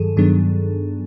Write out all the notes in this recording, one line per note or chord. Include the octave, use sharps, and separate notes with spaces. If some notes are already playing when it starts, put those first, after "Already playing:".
Already playing: G2 D#3 F#3 G#4 A4
G2 D#3 F#3 B3 D4 G#4